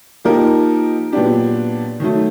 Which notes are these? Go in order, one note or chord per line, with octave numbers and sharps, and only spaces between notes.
F3 A#3 D#4 G4 A#4
A#2 F#3 B3 D4 G4
D#3 F#3 A3